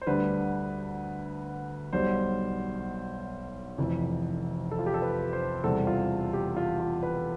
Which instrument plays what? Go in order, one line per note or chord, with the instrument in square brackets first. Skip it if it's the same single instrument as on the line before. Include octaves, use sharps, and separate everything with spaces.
[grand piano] C5
D2 D3 G3 B4
B1 B2 G3 C5
F1 F2 E3
A4
F4
G4
A4
B4
C5
E1 E2 C3 G3 A4
F4
G4
F4
F4
B4